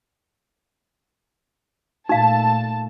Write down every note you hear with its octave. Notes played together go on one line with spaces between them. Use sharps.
A#2 A3 D#4 F5 A5